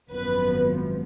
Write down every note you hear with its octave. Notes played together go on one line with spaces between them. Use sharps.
G#1 F#2 F3 B3 B4